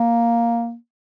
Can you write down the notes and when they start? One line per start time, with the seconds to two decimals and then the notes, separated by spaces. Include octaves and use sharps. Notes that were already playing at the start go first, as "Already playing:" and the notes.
Already playing: A#3